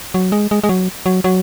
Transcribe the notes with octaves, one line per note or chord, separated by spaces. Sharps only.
F#3
G#3
G#3
G#3
F#3
F#3
F#3